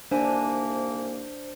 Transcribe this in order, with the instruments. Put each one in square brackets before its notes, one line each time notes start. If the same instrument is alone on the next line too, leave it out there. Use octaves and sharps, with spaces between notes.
[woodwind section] C2 D#3 A#3 [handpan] D4 [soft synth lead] C5 [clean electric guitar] E5 G#5